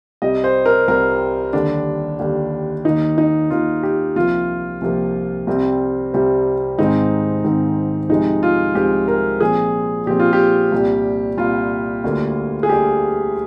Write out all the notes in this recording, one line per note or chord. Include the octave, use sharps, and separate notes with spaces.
C2 C3 G3 D#5
C5
A#4
C2 C3 G3 A#4
D#2 D3 G3 D4
D#2 D3 G3
D#2 D#3 A#3 D#4
D#4
D#2 D#3 A#3 F4
G4
C2 C3 F3 A#3 F4
C2 C3 F3 A#3
C2 C3 G3 C4
C2 C3 G3 C4
G#2 D#3 G#3 C4 D#4
G#2 D#3 G#3 C4
C2 C3 F3 G#3 C4 D#4
F4
C2 C3 F3 G#3 C4 G4
A#4
A#2 F3 C4 G#4
A#2 F3 C4 G4
F4
G4
C2 A#2 G3
C2 A#2 G3 F4
D2 D3 G3 A#3
G#4
D2 D3 G3 A#3 G4